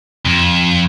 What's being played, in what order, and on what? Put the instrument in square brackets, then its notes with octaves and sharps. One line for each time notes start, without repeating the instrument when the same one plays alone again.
[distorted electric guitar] F2